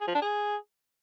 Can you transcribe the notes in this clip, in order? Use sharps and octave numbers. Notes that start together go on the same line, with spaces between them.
G#4
F3
D4
G#4